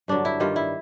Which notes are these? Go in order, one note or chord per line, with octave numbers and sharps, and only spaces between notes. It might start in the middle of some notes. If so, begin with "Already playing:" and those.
G2 D3 F#3 D4
E4
G2 D#3 G3 F4
E4